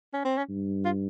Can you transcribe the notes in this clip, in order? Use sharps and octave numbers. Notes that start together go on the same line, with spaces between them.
C#4
C4
C#4
G2
F4